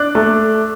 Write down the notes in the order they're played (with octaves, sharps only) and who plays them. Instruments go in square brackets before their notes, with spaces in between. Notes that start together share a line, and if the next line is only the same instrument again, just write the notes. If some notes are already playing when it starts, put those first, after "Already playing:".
Already playing: [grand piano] D4 [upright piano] D6 F#6
[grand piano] A3